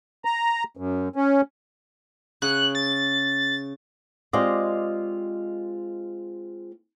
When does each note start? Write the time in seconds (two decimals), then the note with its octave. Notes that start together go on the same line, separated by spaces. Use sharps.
0.25 A#5
0.77 F#2
1.16 C#4
2.42 C#3 F#5 F#6
2.75 A6
4.33 G#3 C4 F4 G4 D5 D#5